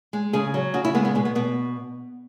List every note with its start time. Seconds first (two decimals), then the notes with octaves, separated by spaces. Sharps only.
0.13 G#3
0.33 C#3 G#4
0.54 F#3
0.74 C#3 F#4
0.85 E4
0.94 G#3 B3
1.05 B3
1.15 B2 G#3
1.25 B3
1.35 B2 B3